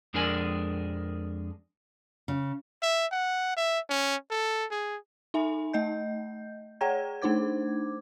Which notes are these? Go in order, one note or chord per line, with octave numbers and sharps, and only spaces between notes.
F2 G#3 D4 A#4 D5 G#5
C#3
E5
F#5
E5
C#4
A4
G#4
D#4 E5 G#5 B5
A3 D#5 G6
G#4 C#5 F#5 G5 A#5 G#6
A3 D4 D#4 C5 D6 G#6